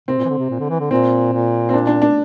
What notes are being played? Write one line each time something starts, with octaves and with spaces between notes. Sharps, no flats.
C3 C4
A#2
E3
D3
C3
A#2
D3
E3
D3
A#2 C4
A#2
C4
D4
D4
D4